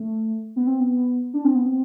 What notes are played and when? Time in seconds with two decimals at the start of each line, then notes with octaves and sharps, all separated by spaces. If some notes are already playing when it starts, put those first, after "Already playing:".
Already playing: A3
0.56 B3
0.67 C4
0.80 B3
1.34 D4
1.44 C4
1.55 B3
1.66 C4